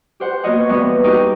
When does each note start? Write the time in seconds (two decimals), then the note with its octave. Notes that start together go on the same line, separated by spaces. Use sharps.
0.20 G4 C5 F#5
0.43 A#3 B3 F#4 C#5 D#5 F#5
0.69 E2 G3 B3
1.04 D#4 F#4 G4